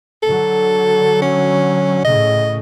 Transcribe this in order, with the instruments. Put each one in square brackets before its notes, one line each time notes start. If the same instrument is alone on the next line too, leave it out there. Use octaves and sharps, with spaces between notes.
[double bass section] D3 F#3 [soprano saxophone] A4
[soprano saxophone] C#4
[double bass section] A2 C#3 [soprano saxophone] D#5